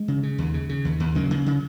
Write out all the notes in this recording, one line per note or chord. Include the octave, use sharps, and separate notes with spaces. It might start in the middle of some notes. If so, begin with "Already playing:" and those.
Already playing: G#3
C#3
C#3
D#2
C#3
C#3
D#2
D#2
C#3 F#3 A#3
C#3
C#3